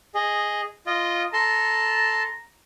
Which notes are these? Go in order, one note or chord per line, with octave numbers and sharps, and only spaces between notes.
G#4 D#5
F4 D#5
A4 A5 A#5 C6